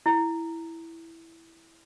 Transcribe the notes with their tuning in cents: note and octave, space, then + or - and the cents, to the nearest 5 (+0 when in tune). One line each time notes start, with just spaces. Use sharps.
E4 +0